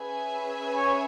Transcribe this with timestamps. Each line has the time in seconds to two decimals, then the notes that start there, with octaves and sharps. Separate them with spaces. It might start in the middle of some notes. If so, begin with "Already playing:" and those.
Already playing: C#4 G#4 B4 E5 G#5
0.76 C#5